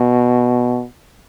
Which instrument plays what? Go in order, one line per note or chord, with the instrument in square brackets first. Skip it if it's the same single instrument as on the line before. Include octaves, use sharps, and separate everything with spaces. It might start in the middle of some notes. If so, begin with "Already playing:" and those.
Already playing: [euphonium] B2